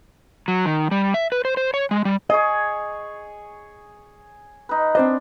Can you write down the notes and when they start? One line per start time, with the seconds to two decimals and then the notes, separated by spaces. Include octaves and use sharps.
0.48 F#3
0.66 D#3
0.91 G3
1.14 E5
1.32 B4
1.45 C5
1.57 C5
1.74 C#5
1.91 G#3
2.05 G3
2.30 G#4 C#5 D#5
4.69 D#4 B4
4.95 C4 D4 C5 D#5